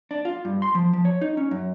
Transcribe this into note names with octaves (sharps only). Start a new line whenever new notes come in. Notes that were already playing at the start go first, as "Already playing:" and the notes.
D4
F4
G2
C6
F3
F3
C#5
D#4
C#4
F#2